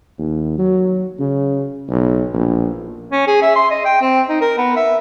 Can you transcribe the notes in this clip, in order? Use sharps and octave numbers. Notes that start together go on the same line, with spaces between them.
D#2
F#3
C#3
B1
A#1
C#4
G#4
E5
C6
D#5
G5
C4
D#4
A#4
B3
E5